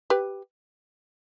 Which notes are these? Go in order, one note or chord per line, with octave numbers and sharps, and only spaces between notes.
G4 B4